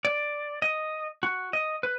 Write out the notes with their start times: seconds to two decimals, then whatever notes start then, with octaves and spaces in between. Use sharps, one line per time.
0.05 D5
0.62 D#5
1.23 F#4
1.53 D#5
1.83 B4